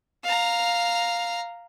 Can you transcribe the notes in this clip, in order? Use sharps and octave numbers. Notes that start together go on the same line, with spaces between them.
F5 A#5